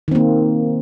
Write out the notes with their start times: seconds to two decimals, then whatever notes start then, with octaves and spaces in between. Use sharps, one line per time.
0.08 D#3
0.11 C4
0.15 A#3